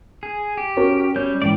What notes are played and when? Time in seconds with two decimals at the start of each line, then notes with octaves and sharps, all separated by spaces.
0.23 G#4
0.57 G4
0.77 C#4 F#4 A#4
1.16 G3 C#4 G6
1.42 G#2 E3 D5 G5